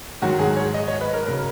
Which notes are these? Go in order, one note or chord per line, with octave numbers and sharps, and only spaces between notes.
G#2 D#3 F#3 F#4
G#4
C#5
D#5
C#5
B4
A#4
C#3 F#3 A#4